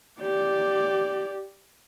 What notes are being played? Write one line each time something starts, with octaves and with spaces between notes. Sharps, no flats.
G4 D5